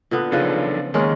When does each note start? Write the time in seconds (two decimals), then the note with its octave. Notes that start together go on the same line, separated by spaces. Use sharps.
0.11 A#2 D3 B3
0.32 C#3 F3 D4 D#4 A4 B4
0.94 D#3 G#3 A#3 C#4 A#4